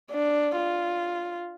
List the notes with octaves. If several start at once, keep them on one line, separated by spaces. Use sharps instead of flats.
D4
F4